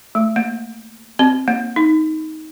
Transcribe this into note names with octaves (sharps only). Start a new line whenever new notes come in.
A3
A#3
C4
A#3
D#4